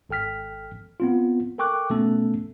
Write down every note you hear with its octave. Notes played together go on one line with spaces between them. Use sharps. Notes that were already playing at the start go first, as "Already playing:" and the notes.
G#1 A4 G5 F6 B6
B3 C4 F4
A4 A#4 G5 C#6 D6 F#6
B2 A3 B3 C#4 A4